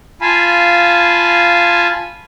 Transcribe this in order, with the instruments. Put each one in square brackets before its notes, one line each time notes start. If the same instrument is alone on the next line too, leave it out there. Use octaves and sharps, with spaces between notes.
[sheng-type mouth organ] F4 F5 G#5 A5 B5